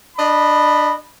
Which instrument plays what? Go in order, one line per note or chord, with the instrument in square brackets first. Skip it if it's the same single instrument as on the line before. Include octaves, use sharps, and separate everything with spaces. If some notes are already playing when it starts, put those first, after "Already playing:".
[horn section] D4 D#5 B5